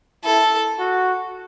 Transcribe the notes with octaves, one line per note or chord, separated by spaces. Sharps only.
E4 A4
F#4